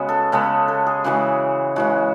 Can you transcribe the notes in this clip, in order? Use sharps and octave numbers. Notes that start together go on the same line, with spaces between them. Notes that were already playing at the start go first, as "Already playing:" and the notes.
Already playing: C#3 G#3 B3 F#4
A4
C#3 G#3 B3 A4
A4
G#4
C#3 E3 G#3 F#4
C#3 E3 G#3 F#4